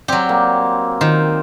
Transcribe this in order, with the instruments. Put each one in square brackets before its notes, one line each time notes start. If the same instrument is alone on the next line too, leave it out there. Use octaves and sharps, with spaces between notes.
[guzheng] F#3 G4 [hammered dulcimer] C4 D5
[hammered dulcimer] A#3
[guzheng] D#3 [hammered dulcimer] F4 C5